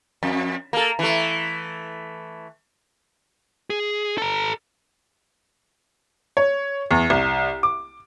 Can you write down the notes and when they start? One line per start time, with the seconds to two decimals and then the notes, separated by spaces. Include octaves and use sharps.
0.23 F2
0.73 A#3 A4
0.99 E3 A3
3.70 G#4
4.18 A4 A#5
6.37 C#5
6.91 E2
7.10 C2
7.63 D6